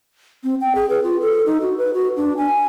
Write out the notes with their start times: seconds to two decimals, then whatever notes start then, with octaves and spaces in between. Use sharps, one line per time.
0.44 C4
0.61 G5
0.75 G#4
0.90 B4
1.03 F4
1.21 A4
1.46 D#4
1.61 F#4
1.78 B4
1.94 F#4
2.16 D4
2.37 G#5